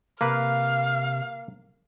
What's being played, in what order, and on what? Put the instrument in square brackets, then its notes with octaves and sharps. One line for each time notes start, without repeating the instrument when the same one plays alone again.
[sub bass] C3 [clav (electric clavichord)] A#3 B4 [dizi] F5 [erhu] F6